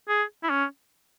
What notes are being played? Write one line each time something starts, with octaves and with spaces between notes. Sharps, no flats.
G#4
E4
C#4